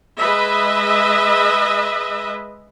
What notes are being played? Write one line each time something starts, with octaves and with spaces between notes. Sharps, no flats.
G#3 B4 D#5 E5